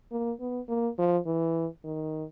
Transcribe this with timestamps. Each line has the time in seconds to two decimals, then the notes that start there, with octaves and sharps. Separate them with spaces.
0.12 A#3
0.40 B3
0.69 A#3
0.98 F3
1.26 E3
1.84 D#3